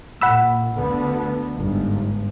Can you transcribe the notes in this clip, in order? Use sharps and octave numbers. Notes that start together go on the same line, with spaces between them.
A#2 F#5 B5 E6
D2 D3 B3
G1 G#2